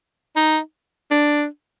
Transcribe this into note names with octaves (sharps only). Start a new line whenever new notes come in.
D#4
D4